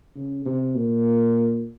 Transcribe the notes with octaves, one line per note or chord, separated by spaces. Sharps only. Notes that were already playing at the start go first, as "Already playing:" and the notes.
C#3
C3
A#2